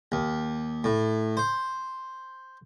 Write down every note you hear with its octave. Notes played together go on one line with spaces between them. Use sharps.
D#2
A2
C5